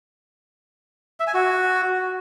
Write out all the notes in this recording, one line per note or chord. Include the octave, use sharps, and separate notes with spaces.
E5
G#5
F#4